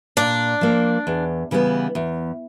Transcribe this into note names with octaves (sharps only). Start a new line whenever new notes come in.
A#2 D4
F3 A#3
E2
C#3 E3 G3 B3
E2